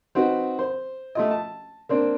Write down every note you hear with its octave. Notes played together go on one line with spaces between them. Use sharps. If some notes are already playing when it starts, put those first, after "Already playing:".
C4 D#4 F#4 B4
C5
A3 F4 D#5
A5
A#3 C4 D4